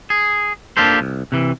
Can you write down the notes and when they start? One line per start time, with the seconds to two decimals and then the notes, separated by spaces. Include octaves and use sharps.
0.10 G#4
0.77 A#3 D4 F4 G4 A4 C5
1.01 C2
1.32 C3 E3